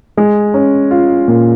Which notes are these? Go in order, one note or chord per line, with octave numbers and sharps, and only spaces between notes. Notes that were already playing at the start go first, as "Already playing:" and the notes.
G#3
C#4
F4
A#2